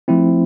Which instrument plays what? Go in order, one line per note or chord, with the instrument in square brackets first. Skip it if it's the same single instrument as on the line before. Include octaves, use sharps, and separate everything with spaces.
[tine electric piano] F3 A3 C4 E4